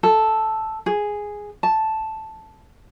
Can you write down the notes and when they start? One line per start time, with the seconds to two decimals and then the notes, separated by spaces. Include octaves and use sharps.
0.03 A4
0.86 G#4
1.63 A5